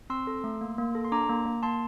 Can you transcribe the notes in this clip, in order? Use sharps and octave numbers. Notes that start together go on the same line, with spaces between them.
C4 C6 E6
A4
A3
A#3
A#3
A4
C6
D4 A#5 D6
A#3
A#3
A#3 A5 C6